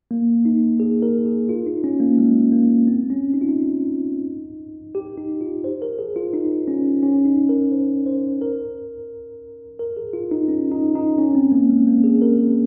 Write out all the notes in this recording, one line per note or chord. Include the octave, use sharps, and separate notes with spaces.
A#3
D#4
G#4
A#4
G#4
F4
D#4
C#4
A#3
G#3
A#3
C4
C#4
D#4
F4
D#4
G4
D#4
F4
C5
A#4
G#4
F4
D#4
C#4
C#4
D#4
A#4
C5
C5
A#4
A#4
G#4
F4
D#4
C#4
D#4
D#4
C#4
C4
A#3
G#3
A#3
G#4
A#4
G#4